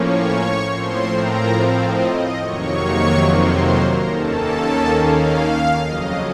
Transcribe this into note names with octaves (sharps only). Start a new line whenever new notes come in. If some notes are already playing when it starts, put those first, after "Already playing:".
Already playing: A2 F3 A#3 C#4 C#5 C#6
A2 F3 C4 C5 C6
A#4 A#5
F5
D#5
D#5
F2 C3 D#3 F#3 A#3 C#5 C#6
C5 C6
C5 C6
A#4 A#5
D#2 D#3 A#3 C#4 A4 A5
F5
F2 C#3 F#3 D#5